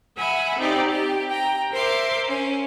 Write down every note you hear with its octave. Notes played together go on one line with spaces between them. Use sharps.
E5 F#5 G#5 B5
C4 D#4 G4 D5
G4
G5 A#5
A#4 C5 E5 C6 D6
C#4